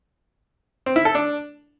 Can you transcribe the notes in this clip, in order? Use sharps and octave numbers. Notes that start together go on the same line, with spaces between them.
C4
E4
A4
D4